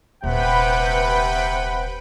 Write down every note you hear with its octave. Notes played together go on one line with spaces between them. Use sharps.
D#1 C3 B4 F#5 G5 B5